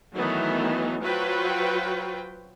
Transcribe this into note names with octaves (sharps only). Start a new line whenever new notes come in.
D#3 E3 F#3 A3 B3 D#4
F#3 F4 F#4 B4 C5 G5